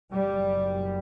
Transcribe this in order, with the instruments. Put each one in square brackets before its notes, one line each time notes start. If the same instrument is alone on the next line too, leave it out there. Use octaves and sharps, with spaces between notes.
[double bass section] F#1 F#2 G3